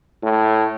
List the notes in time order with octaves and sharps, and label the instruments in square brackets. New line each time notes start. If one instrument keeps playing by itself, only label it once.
[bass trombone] A2